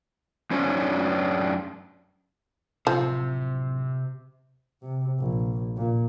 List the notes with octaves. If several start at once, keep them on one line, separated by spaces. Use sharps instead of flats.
F#2 C#4 D4 C5 C#5
D1 C3 F3
C3
A#1
A#2